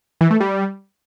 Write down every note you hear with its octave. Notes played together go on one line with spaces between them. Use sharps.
E3
A3
G3